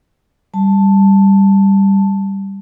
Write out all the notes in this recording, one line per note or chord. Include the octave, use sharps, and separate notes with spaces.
G3 A5